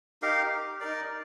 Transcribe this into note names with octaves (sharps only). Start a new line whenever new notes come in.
D#4 G4 A#4 F5
D#4 A#4 D5